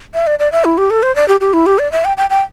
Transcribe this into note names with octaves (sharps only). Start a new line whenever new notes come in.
E5
D5
D5
E5
E4
G4
A4
C5
D5
G4
G4
E4
G4
D5
E5
G5
G5
G5